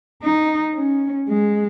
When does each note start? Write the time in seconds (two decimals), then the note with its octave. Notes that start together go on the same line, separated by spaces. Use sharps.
0.22 D#4
0.75 C#4
1.28 G#3